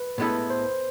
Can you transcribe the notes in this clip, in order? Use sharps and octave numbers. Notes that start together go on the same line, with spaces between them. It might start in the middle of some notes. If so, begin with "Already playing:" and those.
Already playing: B4
A2 G#3 B3 E4 A4
C5